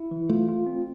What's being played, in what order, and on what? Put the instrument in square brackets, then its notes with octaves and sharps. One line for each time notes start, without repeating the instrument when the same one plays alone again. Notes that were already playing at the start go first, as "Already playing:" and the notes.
Already playing: [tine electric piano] E4
E3
[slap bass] A3 [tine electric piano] F4
[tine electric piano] F4
C4